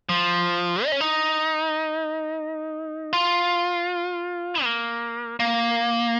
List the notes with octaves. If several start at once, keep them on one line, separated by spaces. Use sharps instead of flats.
F3
D#4
C#4
D#4
F4
A#3
A#3